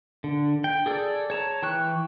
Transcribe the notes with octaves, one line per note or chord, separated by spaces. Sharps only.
D3
G5
G#4 A4 D5
C#5 A5 A#5
E3 G5 C#6 F#6